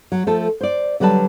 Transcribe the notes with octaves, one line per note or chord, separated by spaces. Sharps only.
F#3
F3 A3 A4
C5 D5
D3 F#3 G3 B4 A5